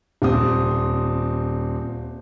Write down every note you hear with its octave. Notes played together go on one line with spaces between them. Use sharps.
D#1 C4 D#6